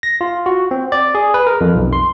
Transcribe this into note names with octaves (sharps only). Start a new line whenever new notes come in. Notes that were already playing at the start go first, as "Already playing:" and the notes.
A#6
F4
F#4
C4
D5
G#4
B4
A#4
F2
B1
C6